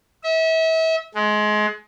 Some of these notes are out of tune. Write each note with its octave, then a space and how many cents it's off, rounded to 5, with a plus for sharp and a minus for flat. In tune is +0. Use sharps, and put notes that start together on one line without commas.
E5 -35
G#3 +25